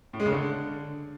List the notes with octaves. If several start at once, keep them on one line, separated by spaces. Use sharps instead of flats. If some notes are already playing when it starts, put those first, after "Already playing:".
A2
G#3
C#3
D3